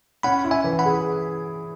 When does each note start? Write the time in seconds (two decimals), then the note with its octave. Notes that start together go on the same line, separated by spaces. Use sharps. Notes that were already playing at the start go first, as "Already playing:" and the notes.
0.23 C#4 F#5 B5
0.44 E4
0.51 E5 G#5
0.64 E3
0.79 F#5 B5
0.86 G#4